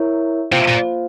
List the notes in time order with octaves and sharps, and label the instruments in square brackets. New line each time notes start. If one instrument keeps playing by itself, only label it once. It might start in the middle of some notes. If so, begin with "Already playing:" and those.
Already playing: [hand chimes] E4 A#4 C#5 E5
[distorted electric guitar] C3 [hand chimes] A#3 F4 C5 F5
[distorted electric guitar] A#2